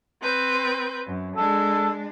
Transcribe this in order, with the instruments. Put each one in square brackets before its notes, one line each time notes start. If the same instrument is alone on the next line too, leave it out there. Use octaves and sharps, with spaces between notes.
[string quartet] C4 B4 G6
F#2
[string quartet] G#3 D4 [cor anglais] A4